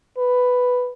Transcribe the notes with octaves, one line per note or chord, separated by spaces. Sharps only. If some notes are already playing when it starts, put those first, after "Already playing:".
B4